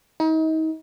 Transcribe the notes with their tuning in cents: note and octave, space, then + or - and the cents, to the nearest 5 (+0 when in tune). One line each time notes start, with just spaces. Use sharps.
D#4 +35